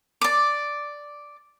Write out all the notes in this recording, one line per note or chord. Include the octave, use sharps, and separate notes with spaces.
D5 D6